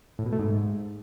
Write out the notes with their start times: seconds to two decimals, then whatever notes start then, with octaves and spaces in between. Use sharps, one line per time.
0.19 A2
0.26 B2
0.32 A3
0.39 G#2